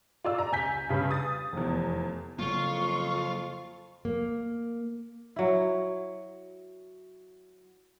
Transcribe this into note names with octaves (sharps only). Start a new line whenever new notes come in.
F4 D5 E6
A#5
C#2 G#5 G6 B6
G2 C#3 B4
D#6 A6
F1 E2
F2 C#3 F#3 A#3 F4 C#6
A#3
F#3 E4